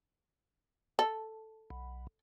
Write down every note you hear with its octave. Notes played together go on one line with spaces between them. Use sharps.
A4
B1